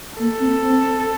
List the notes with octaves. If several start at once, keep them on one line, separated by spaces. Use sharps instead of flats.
A#3 A4
C4
C4